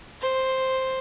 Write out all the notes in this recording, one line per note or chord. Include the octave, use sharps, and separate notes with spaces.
C5